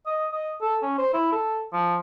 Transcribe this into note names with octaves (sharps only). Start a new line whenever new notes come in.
D#5
D#5
A4
C#4
C5
E4
A4
F3